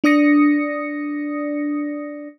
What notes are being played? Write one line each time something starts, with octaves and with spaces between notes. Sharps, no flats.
D4 D5 D#6 A#6 C#7